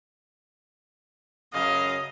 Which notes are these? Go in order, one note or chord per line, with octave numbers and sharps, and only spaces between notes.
F#2 C#3 D#5 F5